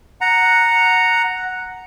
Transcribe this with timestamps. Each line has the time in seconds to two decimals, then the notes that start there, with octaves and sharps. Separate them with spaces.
0.21 F#5 A#5